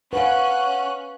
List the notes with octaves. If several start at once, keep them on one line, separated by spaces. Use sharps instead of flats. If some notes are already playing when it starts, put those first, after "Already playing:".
C#4 B4 F5 F#5 C#6 F#6